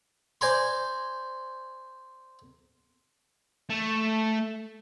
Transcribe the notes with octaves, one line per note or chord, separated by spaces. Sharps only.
C5 D5 G#5 A#5 C6
A3